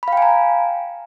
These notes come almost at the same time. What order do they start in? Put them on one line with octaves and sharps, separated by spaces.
B5 F5 G5 G#5 A#5